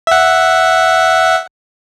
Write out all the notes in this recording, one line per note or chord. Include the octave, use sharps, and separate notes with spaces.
E5 F#5